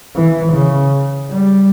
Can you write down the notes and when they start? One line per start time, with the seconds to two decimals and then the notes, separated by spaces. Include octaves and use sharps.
0.15 E3
0.53 C#3
1.29 G3